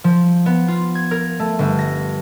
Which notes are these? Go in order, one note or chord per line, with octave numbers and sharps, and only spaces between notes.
F3
B3
F4
G#6
A#4
A3
G1
A#6